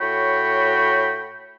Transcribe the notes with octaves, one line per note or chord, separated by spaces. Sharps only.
A2 F#4 C#5 G5 B5